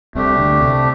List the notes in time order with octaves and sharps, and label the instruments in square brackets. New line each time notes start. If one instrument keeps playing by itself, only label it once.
[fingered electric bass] C2 C3 [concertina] A3 D4 G4
[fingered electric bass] D2 D3
C2 C3